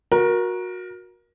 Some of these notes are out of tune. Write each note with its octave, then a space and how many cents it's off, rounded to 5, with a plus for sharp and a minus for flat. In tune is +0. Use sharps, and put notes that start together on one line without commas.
F#4 -20 A#4 +20